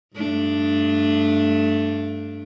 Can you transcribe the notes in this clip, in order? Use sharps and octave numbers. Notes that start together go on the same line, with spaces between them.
G2 A3 D4